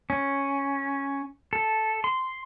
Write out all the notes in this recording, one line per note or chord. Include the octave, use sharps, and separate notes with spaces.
C#4
A4
C6